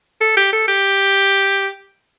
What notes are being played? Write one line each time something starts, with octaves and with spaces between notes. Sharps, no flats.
A4
G4
A4
G4